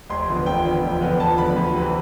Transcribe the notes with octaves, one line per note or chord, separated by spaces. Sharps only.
F1 C6
E2 D3 F3 B3
F1 G5
E2 D3 F3 B3
F1
E2 D3 F3 B3
F1 A5
E2 D3 F3 B3 B5
D2
C3 E3